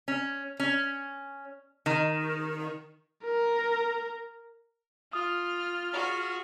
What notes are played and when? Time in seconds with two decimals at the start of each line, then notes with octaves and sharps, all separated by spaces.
0.08 C#4
0.60 C#4
1.86 D#3
3.24 A#4
5.13 F4 D#6 F6
5.93 F#4 G#4